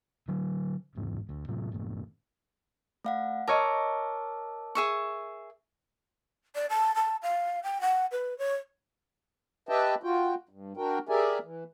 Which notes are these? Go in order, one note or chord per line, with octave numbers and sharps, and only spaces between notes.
D3 F#3
D1 G#1 E2 G#2
D2
A2 C3 F#3
F#1 A2
A3 F5 F#5
A#4 C#5 D#5 A5 D6 E6
G#4 E5 C#6
D5
A5
A5
F5
G5
F#5
B4
C#5
G4 B4 D#5 E5 G5 A5
F4 F#4 G5
G2
D4 F#4 A#4 G5
G4 G#4 A#4 D5 E5 G#5
E3